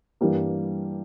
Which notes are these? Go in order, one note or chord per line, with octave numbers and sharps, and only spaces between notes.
G2 E3 G3 A#3